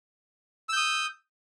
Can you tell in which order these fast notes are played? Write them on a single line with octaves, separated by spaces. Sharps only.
E6 G6 D#6